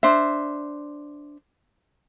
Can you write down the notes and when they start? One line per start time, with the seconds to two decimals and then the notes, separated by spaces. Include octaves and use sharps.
0.03 D4 C5 E5